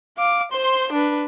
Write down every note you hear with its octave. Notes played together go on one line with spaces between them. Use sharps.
F5 D6
C5 C6
D4 B4